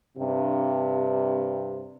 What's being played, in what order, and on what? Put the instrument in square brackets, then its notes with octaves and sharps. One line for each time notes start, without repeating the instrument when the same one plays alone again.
[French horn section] G2 C3